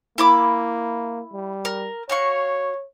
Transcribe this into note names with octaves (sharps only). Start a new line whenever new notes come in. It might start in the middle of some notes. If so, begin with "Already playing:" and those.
A#3 E4 B5 D6
G3
A#4
F#4 C#5 F5 C#6